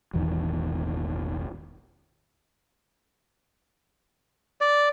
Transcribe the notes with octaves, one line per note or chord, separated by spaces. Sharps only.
E1 A1 E2 D#3
D5